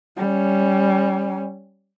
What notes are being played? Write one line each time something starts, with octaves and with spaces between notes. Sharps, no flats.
G3 C#4